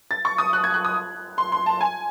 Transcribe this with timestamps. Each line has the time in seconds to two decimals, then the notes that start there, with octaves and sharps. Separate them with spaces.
0.11 A6
0.25 C#6
0.38 D#6
0.53 F#6
0.64 G#6
0.74 F#6
0.85 D#6
1.38 C6
1.52 C6
1.66 A5
1.81 G#5